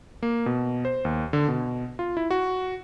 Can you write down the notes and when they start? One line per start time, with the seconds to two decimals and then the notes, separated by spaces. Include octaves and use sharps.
0.23 A#3
0.46 B2
0.85 C5
1.05 D#2
1.33 D3
1.48 B2
1.99 F4
2.17 E4
2.31 F#4